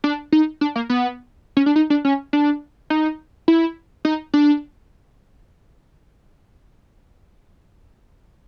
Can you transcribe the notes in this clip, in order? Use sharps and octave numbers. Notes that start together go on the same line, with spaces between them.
D4
D#4
D4
A#3
B3
C#4
D4
D#4
D4
C#4
D4
D#4
E4
D#4
D4